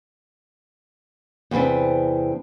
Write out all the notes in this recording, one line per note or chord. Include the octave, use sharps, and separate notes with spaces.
E2 C3 B3 C4 D4